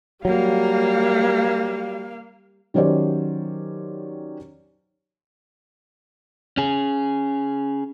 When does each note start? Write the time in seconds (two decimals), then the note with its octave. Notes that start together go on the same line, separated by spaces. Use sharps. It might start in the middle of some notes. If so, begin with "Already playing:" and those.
0.25 F#3 G3 A#3 F5
2.74 D#3 F#3 C#4 G4 C5 D5
6.57 C#4 G#4